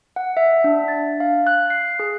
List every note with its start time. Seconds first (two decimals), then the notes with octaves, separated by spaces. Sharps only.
0.16 F#5
0.37 E5
0.64 D4
0.88 A6
1.20 F5
1.47 F#6
1.70 C7
2.00 G#4